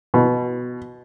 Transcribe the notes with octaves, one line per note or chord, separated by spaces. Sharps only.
B2